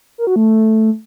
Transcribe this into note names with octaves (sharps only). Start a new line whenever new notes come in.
A#4
F#4
A3